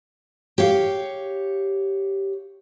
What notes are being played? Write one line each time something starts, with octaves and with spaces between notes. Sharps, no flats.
G4 C#5 F5